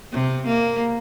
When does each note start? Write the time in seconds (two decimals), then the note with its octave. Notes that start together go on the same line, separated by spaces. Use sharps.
0.12 C3
0.47 A#3